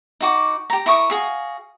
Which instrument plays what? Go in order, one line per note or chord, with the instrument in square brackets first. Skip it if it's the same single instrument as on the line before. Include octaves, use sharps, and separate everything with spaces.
[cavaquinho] D#4 F#4 D6
G4 A#5
E4 A#4 C#6 D#6
F#4 G#4 F5